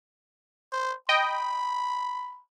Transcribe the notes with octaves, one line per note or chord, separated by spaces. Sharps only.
C5
D#5 G5 B5